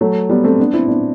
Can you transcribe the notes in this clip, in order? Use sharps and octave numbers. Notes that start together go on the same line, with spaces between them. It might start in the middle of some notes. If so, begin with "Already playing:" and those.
F#3 A3
G3 B3
A3 C4
B3 D4
C4 E4
B3 D4